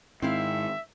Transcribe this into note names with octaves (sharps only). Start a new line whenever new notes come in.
G#2 D#3 C4 E4 E5 F5